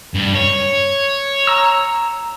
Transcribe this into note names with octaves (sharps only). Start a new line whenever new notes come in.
G2
C#5
A#5 E6